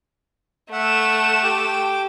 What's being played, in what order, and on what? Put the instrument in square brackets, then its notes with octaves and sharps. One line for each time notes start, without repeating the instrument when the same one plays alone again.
[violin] A3 E7 [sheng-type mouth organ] E5 F#5
[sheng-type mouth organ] G4 G5 D6